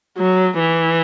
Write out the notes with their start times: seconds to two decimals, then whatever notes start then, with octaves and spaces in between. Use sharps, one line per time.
0.18 F#3
0.59 E3